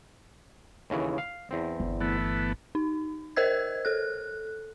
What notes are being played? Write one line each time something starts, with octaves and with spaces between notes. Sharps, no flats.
D#2 C#3 E3
F5
E2 C4
G1
E3 A3 B3
D#4
A#4 C5 D#5 E6 G#6
A4 F#6